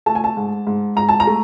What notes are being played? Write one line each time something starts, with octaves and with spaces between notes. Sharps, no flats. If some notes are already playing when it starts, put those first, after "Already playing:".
A3 A5
G#5
A5
G#2
G#2
G#2 A#5
A5
A#5
A3